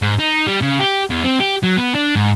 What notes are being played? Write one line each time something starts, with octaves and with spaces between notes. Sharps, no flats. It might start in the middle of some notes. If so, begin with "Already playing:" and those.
G#2
D#4
G3
C#3
G4
E2
C4
G4
F#3
B3
D4
G#2